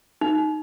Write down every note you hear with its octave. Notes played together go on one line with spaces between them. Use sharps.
D#4